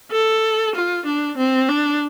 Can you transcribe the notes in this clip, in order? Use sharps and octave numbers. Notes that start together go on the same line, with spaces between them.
A4
F4
D4
C4
D4